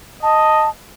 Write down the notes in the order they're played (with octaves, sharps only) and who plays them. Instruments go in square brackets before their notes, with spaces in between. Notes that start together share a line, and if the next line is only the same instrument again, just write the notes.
[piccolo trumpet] D#5 [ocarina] A5